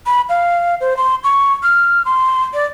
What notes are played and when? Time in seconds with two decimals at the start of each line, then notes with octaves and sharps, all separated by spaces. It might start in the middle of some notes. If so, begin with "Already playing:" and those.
0.06 B5
0.29 F5
0.81 C5
0.97 C6
1.24 C#6
1.63 F6
2.05 C6
2.54 D5